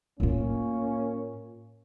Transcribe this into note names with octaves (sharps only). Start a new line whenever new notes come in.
A2 A#3 C#4 F4